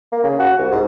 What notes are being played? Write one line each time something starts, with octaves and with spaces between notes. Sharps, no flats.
A#3
C#3
F#4
C2
G#2